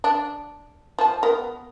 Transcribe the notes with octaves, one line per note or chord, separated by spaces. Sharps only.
D4
F3 A5
B3 A#4